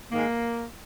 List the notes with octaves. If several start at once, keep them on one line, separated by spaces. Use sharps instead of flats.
G#2 D#3 G#3 A#3